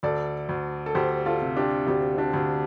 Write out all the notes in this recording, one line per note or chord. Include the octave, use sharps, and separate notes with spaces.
D2 A4 D5
D2
A4
D2 G4 C5
F4 A4
C3
D4 G4
D2 D4 G4
D4 G4
D2